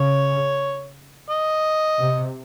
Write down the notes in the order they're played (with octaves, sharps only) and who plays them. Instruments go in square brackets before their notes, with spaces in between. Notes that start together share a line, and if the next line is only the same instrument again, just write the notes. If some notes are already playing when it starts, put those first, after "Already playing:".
Already playing: [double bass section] C#3 [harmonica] C#5
[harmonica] D#5
[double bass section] C3